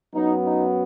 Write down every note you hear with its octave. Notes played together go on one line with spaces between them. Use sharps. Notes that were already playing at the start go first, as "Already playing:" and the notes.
F#2 F#3 B3 D#4
D#4